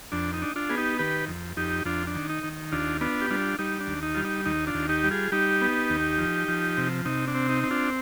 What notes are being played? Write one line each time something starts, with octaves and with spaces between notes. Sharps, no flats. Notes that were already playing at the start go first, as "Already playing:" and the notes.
F2 D4
D#4
D4
D4 F4
B3 G#4
D#4 G4
D#3 G4 B4
F2
F2 D#4 G4
F2 D4 F4
D4
D#3
D#4
D#3
D#2 D4 F4
B3 D4 F4
G4
G3 D4 F4
G3 D#4
D4
D#2
D#4
G3 F4
D#4
D#2 D#4
D4 F4
D#2
D#4 G4
G3
F4 G#4
G3 D#4 G4
B3
D#2
F3
F3
C3
C3 D#4
D4
C4
D#4
C4
D4 F4